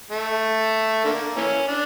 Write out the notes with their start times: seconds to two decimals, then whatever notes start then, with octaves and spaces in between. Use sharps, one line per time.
0.11 A3
1.05 D3 A#3
1.37 E3 A#3 C#4
1.67 D4